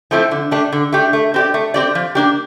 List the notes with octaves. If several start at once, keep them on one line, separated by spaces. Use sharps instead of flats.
F3 A3 C4 E4
D3
A3 D4 G4
D3
A3 D4 G4
A3
C4 G4 D5
A3
C4 G4 D5
F3
A#3 D4 G4